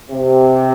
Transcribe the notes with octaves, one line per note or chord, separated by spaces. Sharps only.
C3